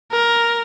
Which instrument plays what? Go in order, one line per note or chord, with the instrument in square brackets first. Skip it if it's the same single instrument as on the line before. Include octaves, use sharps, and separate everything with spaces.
[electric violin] A#4